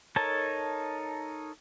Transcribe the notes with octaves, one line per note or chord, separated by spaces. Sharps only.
D#4 A4 A#4 C#5 A5